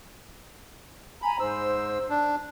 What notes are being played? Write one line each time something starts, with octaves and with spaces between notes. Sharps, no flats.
G#5 A#5 B5
G#2 C5 E6
D4